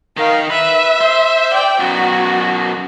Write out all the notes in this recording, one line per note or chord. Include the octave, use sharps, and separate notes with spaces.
D#3 D#4 A#4 F5
B4 E5
C5
D5 G5
F#2 B2 F#4